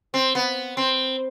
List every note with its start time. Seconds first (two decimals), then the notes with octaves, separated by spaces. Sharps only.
0.14 C4
0.35 B3
0.77 C4